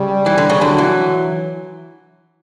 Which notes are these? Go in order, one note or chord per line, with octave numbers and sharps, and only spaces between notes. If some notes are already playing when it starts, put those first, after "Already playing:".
Already playing: C#3 G3
E3
D3
C#3
D3 F#3
E3